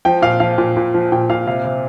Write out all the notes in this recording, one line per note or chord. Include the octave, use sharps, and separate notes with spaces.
F3 G5
A#2 F5
F3 F5
A#2
A#2
F3
A#2 G5
A#2 F5
C3 F5
C3